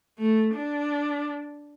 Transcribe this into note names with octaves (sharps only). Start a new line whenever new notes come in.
A3
D4